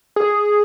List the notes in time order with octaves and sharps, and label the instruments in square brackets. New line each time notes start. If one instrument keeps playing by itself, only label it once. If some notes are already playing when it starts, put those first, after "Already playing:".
[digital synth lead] G#4